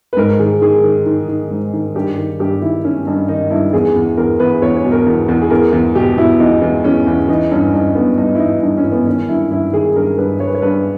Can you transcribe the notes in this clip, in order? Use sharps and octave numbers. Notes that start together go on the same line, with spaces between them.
B4
G#2 A#4
D#3 G#4
D#3 G#4
D#3
D#3
D#3
G#2
D#3
G2 G4
D#3
G2 G4
D#3 E4
D#3 C#4
G2 D#4
D#3 D#4
G2 E4
E2 G#4
E2
E2 A#4
E2 B4
E2 C#5
C#5
B2
A#4
E2
E2
G#4
E2 A#4
E2
B2 G4
B2 E4
E2 D#4
E2
E2 C#4
E2
E3 D#4
G2 C#4
G2 D#4
G2 B3
G2 D#4
E4
E3 D#4
G2 D#4
C#4
E3
B3
D#3 C#4
G2 E4
G2 E4
D#3 G#4
G2 A#4
G2 B4
G2 C#5
B4
C#5
G2 B4